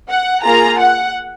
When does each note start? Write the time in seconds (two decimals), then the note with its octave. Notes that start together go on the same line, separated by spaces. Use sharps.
0.09 F#5
0.43 A#3 F4 G#4 A#5
0.78 F#5